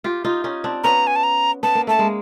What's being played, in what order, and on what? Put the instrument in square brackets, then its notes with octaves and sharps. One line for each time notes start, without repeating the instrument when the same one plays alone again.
[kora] F4 G4
D#4 F4
C#4 D#4
C4 D4
[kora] B3 C#4 [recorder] A#5
[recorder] G#5
A5
A#5
[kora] B3 [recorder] A5
[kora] A#3
[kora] A3 [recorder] A5
[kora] G#3 A#3